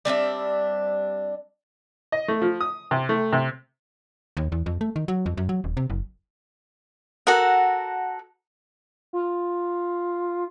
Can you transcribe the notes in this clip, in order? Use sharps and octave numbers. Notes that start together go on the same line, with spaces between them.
G3 C4 D4 E5
D#5
A3
F3
D#6
C3
A3
C3
D#2
E2
F2
A3
D#3
F#3
F2
F#2
F#3
D#1
C3
F#1
F#4 A4 A#4 F#5
F4